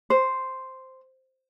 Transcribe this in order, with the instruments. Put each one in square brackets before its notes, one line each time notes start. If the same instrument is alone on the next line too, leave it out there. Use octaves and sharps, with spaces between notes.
[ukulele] C5